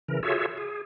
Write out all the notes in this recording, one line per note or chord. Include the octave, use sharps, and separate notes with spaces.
C#3 E3 A#4
F4 F#4 G#4 A4 C#5 E5
G#4